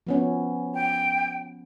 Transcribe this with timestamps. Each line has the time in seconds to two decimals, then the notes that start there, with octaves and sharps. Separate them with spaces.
0.07 F3 B3 C#4
0.74 G5